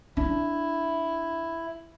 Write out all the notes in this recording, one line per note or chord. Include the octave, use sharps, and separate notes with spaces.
D4 E4